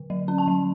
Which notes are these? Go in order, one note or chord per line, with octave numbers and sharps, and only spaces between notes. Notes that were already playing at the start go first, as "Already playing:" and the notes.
Already playing: D3
F#3
C#4
A5
F#3